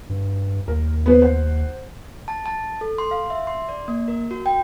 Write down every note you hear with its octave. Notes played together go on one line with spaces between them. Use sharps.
G2
D#2 A#4
B3 B4 C5
C5 F#5
A5
A5
A4
C6
F5
E5
C6
D5
A#3
A#4
F#4
G5